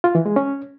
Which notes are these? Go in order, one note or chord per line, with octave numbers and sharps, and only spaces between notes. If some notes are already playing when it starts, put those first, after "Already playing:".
F4
E3
G#3
C#4